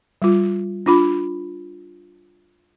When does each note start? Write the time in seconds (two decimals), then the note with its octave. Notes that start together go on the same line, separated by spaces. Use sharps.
0.22 G3 F4
0.86 D4 F4 B5